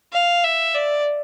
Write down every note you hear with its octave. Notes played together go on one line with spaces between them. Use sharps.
F5
E5
D5